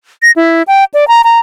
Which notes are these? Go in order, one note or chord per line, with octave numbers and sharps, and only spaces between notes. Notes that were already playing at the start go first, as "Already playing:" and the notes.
A#6
E4
G5
D5
A#5
A#5